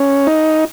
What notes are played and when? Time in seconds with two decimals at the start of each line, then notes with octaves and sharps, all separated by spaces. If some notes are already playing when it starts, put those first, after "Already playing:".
Already playing: C#4
0.27 D#4